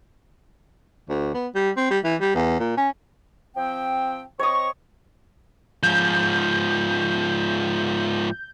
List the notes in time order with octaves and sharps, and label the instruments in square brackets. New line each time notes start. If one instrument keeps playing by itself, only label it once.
[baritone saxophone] D2
B3
G3
C4
G3
E3
G3
E2
A#2
C#4
[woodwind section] F3 C4 G5
[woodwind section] C4 D#5 C#6 [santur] C#5 D#6
[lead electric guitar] G#2 F3 [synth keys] G6